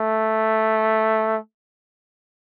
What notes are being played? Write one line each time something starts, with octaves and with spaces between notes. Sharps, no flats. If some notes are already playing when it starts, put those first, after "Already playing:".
Already playing: A3